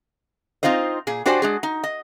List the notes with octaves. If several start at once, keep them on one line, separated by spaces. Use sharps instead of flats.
C4 D#4 F4 C5 D#5
A#2 G#4
D4 F#4 G4 C5 D5 G#5
G#3 D4 G#4
D#4
D#5